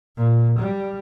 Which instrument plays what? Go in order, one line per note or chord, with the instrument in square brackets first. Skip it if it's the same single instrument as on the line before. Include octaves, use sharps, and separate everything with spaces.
[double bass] A#2
G3